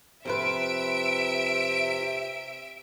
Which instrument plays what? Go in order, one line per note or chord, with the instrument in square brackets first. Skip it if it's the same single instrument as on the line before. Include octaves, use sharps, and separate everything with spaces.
[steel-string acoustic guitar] F2 F4 B4 [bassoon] C3 [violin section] E5 D7